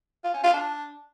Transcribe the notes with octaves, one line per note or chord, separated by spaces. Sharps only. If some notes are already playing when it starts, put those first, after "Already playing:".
F4
C#4
F4
D4